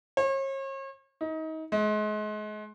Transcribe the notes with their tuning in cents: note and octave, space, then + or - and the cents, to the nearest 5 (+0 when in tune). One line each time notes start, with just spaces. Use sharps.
C#5 -40
D#4 +30
G#3 +35